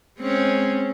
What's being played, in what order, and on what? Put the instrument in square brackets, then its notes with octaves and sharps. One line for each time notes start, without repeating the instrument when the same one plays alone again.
[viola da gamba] G#3 C4 C#4